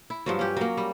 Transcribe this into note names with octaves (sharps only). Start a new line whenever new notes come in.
E4
G2 F3 F#3
C#4 G4
F#3 A#3
G3